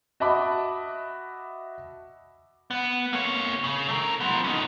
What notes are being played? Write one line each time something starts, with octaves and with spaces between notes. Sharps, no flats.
F#4 D#5 E5 A5 B5 D6
B3
A#3 C#5
C#3
A3 A#4
F3 B3
C#4 D#4